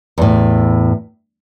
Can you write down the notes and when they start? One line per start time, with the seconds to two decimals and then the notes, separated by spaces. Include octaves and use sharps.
0.18 E2 A2